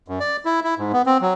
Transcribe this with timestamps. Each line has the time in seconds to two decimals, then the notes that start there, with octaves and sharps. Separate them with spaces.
0.08 F#2
0.20 D5
0.45 E4
0.64 E4
0.78 G#2
0.93 B3
1.06 C4
1.21 F#3